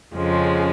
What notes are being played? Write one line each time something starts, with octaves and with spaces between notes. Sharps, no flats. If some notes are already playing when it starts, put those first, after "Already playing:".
F2 C#3 F3 G#3 C#4